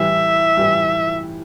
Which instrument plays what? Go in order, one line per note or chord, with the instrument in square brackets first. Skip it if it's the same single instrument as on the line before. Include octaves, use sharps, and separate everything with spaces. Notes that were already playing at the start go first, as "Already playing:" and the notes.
Already playing: [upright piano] A2 E3 G3 [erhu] E5
[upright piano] A2 E3 G3